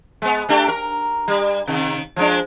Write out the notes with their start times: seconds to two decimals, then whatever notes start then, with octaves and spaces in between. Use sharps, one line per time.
0.22 G#3 B3
0.49 A3 D4 G4
0.68 A#4
1.28 G3
1.67 C3 D#3
2.16 F3 G#3 D4